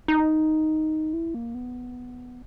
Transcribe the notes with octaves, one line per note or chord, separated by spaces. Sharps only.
D#4
E4
A#3
B3